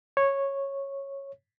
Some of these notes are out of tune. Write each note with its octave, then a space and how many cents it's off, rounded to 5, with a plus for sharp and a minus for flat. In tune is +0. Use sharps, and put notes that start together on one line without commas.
C#5 -10